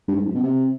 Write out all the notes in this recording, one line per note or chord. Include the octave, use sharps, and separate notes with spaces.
G2
G#2
F#2
B2
C3